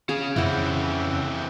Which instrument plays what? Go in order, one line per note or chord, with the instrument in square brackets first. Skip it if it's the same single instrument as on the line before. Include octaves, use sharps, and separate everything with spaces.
[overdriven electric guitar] C#4 F5 [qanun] G#4
[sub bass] F2 [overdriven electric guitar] C#3 [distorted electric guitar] E3 C4 [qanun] E4 F#5